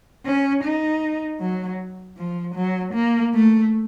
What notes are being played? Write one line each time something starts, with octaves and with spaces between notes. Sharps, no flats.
C#4
D#4
F#3
F3
F#3
A#3
A3